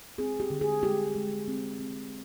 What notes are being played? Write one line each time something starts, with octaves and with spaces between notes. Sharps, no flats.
C4 G#4
G4
D3
G#4
G#3 G4
G#3
C4
C4